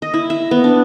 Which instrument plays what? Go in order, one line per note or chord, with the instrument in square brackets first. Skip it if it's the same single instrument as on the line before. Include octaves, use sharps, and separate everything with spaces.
[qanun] D#5
E4
E5
B3
D4